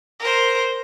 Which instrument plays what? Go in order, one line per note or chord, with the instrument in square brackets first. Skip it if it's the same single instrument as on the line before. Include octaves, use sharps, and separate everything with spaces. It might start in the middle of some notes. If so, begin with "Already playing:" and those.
[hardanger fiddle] A#4 C5